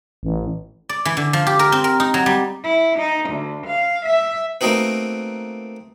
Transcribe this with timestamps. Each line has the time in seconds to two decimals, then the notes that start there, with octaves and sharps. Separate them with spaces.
0.23 A1
0.89 D5
1.05 E3
1.17 D3
1.33 F3
1.47 G4
1.59 A#4
1.72 C4
1.84 A#4
2.00 D#4
2.14 F#3
2.26 G3
2.63 E4
2.98 D#4
3.29 D2
3.66 F5
4.05 E5
4.61 A3 A#3 C4 D#4 F#4 B4